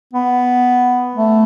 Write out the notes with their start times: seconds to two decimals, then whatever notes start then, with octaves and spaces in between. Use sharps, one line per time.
0.13 B3
1.15 A3